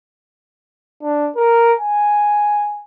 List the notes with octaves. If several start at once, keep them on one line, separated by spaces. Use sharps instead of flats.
D4
A#4
G#5